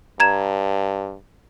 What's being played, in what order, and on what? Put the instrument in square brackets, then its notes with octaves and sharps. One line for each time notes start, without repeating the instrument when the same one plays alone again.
[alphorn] G2 [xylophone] A#5 G#6 E7